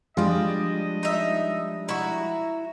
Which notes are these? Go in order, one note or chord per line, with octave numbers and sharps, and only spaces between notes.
F3 G3 G#3 D4 F4 D#5
D#4 E5
E4 F#4 A#5